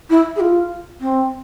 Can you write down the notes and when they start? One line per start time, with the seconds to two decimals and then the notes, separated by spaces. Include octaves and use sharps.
0.10 E4
0.36 G#4
0.40 F4
1.00 C4